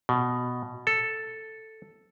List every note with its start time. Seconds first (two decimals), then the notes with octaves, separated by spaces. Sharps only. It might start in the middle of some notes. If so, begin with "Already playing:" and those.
0.09 B2
0.87 A4